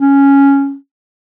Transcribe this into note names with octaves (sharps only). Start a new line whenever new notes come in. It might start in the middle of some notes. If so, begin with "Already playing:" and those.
C#4